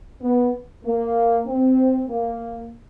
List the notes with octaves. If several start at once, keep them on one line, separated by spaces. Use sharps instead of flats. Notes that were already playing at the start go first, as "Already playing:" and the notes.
B3
A#3
C4
A#3